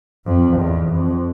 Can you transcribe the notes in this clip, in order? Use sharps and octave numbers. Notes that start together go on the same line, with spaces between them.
F2
E2
F2